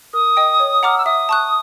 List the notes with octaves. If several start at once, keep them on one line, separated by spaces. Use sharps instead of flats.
A#4 D#6
D#5 G5
C#5
F#5 A#5 D6 F6
E6
E5 D#6
A5 C#6 F#6